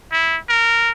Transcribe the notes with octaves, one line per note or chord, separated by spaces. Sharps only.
E4
A#4